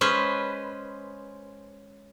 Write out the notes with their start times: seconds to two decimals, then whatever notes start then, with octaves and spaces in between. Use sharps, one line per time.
0.01 G#3 C#4 B4 C5